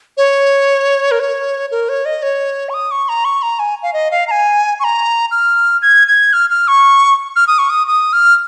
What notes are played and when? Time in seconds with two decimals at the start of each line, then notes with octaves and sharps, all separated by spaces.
0.17 C#5
1.11 A#4
1.20 C#5
1.71 A#4
1.89 C#5
2.05 D#5
2.23 C#5
2.69 C#6
2.74 D#6
2.91 C#6
3.09 A#5
3.25 C#6
3.42 A#5
3.59 G#5
3.83 F5
3.93 D#5
4.11 F5
4.28 A#5
4.31 G#5
4.80 C#6
4.84 A#5
5.31 F6
5.82 G#6
6.08 G#6
6.33 F6
6.50 F6
6.68 C#6
7.36 F6
7.47 D#6
7.59 C#6
7.70 D#6
7.87 D#6
8.13 F6